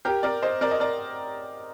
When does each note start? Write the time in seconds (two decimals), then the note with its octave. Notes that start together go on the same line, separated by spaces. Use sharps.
0.05 G4 A#4
0.23 A#4 D5
0.42 C5 D#5
0.61 A#4 D5
0.71 D#5
0.80 A#4 D5